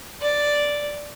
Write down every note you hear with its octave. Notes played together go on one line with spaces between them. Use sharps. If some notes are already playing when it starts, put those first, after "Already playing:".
D5